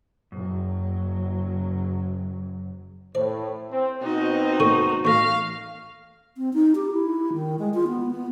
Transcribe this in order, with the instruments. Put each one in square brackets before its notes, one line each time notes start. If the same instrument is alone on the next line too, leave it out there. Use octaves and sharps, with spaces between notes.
[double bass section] F#1 F#3 [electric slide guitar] F#2
[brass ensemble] A2 [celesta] C5 [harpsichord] D5
[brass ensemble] C4
[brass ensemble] B2 C4 [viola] D#4 F#4
[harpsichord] A#2 C#3 A3 [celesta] C#6 D#7
[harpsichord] A1 A3 [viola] F5 [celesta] C#6 A#6
[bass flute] C4
D#4
G4
E4
D#3
G#3
F4
B3
B3